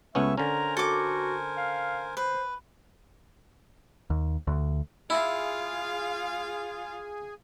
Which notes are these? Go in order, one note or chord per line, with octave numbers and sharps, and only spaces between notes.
C#2 A3 B3 C#4 C#5 E5 C#6
D3 C#4 A#4 C5 G#5 A#5
F#4 A4 D6
F5
B4 C5
D#2
D2
E4 F4 G#4 F5